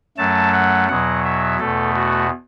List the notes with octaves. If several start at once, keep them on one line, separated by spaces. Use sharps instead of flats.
F#2 F#3 A3 A5
F#5
E2 B2 F#3 F#5
E5
E2 B2 A3 A4
F#4